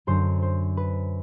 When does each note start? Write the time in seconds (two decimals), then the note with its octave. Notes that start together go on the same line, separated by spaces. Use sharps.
0.07 F#2 D3 C5
0.42 C5
0.77 B4